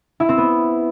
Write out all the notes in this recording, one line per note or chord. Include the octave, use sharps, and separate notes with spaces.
E4
C4
B3